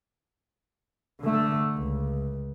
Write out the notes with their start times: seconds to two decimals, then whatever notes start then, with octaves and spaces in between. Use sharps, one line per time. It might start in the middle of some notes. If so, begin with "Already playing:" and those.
1.21 D3 A3
1.76 C#2